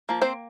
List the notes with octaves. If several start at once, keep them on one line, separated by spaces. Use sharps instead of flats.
F3 A#3
C4 C5